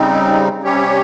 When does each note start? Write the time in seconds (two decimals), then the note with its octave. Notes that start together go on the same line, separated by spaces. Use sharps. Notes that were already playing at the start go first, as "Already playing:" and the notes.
Already playing: C#3 G3 C4 D#4
0.63 C3 G3 C#4 G4 C#5